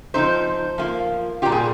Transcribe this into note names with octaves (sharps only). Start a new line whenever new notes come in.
F3 C4 D#4 C5
F3 A#3 F4
A#2 G3 C4 F4 G4
G#4